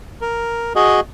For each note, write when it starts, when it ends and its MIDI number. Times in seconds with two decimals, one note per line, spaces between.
0.21 0.73 70
0.76 1.00 66
0.76 1.00 68
0.76 1.00 75